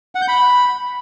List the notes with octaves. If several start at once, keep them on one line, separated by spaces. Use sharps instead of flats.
F#5
G6
B5